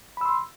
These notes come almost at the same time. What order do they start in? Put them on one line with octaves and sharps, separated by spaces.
B5 E6 C6